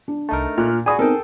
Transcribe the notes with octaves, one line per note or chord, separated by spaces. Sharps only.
D4
C2 A3 D#4 A#4 A5
A#2 F6 F#6
F#4 G#4 D5 G5 G#5 B5 D#6
B3 C4 D#4 A4 A#4 G5